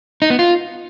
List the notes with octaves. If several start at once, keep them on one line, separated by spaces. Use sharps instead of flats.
D#4
B3
F4